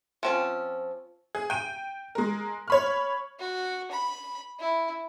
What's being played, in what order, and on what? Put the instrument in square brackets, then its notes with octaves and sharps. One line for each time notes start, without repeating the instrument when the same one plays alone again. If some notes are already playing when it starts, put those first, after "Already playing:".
[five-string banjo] F3 C4 C#4
[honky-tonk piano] G#4
G5 D#7
G#3 A#4
C#5 B5 F6
[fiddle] F#4
B5
E4